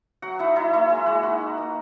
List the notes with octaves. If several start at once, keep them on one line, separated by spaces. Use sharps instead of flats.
F#3 F#4 F#5
D#4 E4 E5
F#3 E4 E5
A#3 E4 E5
G#3 E4 E5
G#3 F#4 F#5
D#4 F#4 F#5
D#4
A#3